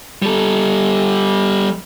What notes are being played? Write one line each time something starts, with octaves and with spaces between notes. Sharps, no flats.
G3 A4